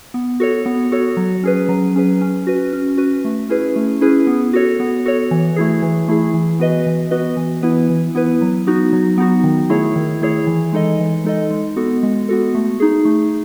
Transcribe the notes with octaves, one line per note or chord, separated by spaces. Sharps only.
B3
F#4 A4 C#5
B3
F#4 A4 C#5
F#3
C#4 G#4 B4
F#3
C#4 G#4 B4
C#4
F#4 B4
C#4
F#4 B4
A3
C#4 E4 G#4 B4
A3
C#4 E4 G#4 B4
B3
F#4 A4 C#5
B3
F#4 A4 C#5
E3
A3 E4 G#4
E3
A3 E4 G#4
E3
B3 F#4 B4 D#5
E3
B3 F#4 B4 D#5
E3
B3 E4 B4
E3
B3 E4 B4
F#3
B3 D#4 F#4
F#3
B3 D#4 F#4
D#3
A3 E4 G#4 C#5
D#3
A3 E4 G#4 C#5
E3
G#3 D#4 A4 D#5
E3
G#3 D#4 A4 D#5
G#3
B3 F#4 A4
G#3
B3 F#4 A4
A3
D#4 G#4
A3